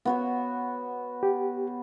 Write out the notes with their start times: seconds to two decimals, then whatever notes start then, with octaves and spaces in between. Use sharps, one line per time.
0.05 B3 F#4 C#5
1.23 G4